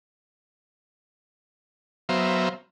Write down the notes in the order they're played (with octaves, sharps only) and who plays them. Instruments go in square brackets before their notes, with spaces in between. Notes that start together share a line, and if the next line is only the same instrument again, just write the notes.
[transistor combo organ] F#3 B3 C5 E5 F5 A#5